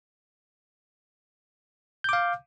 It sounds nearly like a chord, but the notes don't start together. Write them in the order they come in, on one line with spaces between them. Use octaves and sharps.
G6 D6 F5